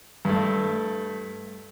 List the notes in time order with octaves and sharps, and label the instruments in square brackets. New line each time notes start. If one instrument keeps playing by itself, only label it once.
[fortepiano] G2 A3